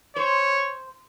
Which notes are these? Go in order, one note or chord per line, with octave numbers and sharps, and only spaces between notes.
C5 C#5